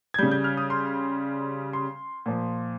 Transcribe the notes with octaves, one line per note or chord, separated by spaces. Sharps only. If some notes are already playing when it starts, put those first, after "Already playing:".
G#6
C#3 G3 G6
G6
F6
D#6
C6
C6
A#2 F3